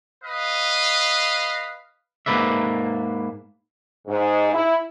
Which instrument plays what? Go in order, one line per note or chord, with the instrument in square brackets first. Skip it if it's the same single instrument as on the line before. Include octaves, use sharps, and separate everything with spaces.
[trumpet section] B4 D#5 F5
[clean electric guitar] G#2 D#3 A#3 B4 D5 E5
[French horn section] G#2
E4